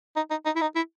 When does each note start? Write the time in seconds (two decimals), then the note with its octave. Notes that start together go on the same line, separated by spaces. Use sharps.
0.16 D#4
0.31 D#4
0.46 D#4
0.56 E4
0.61 D#4
0.76 E4